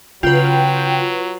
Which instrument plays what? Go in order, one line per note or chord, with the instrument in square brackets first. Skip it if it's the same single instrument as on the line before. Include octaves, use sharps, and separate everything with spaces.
[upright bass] C#3 [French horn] F#3 [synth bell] F4 B4 [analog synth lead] G5